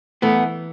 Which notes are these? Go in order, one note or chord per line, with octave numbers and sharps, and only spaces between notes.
E3 A3 B3